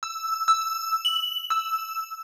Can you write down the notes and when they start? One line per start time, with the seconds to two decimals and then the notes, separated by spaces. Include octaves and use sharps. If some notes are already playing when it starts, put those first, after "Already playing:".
0.03 E6
0.48 E6
1.05 F#7
1.50 E6